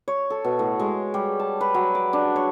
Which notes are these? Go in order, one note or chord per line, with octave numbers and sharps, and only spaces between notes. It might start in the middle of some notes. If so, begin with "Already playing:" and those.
C#5
A4
B2
A2
G#3
G3
A5
B4
F#3
D6
D4
C#5